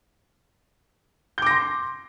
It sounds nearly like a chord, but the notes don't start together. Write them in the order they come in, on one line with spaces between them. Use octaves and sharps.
G6 D6 A#6 C6